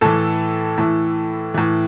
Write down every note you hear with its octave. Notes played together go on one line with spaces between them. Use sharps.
A2 E3 A4
A2 E3
A2 E3